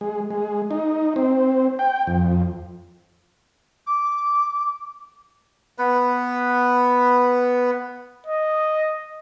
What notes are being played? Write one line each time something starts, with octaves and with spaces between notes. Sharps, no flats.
G#3
G#3
D#4
C4
G5
F2
D6
B3 B4
D#5